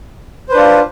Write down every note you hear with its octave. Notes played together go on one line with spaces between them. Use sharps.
D4 F4 B4 C5